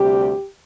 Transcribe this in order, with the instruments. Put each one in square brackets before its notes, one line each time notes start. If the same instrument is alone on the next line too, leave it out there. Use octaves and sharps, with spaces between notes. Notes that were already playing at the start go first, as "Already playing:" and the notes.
Already playing: [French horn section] D2 C3 G3 G4